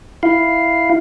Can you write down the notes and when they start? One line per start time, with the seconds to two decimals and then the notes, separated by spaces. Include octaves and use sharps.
0.23 E4 F5